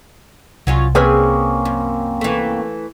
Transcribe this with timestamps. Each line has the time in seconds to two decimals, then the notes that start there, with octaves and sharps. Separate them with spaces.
0.67 C2 F#3 C#4 F4
0.95 A#3 C4 C#4 G#4 B4 C#5
1.65 F#2
2.21 E3 A3